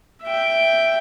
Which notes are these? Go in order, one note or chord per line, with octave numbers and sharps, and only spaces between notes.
E5 G5